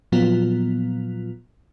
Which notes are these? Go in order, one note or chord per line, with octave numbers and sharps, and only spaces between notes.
A#2 F3 F#3 B3 F4